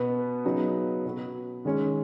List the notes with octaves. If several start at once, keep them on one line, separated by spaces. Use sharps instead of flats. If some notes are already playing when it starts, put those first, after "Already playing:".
Already playing: B2 B3 F#4 B4
C#3 F#3 B3 D#4
B2 B3 F#4 B4
D#3 G#3 C#4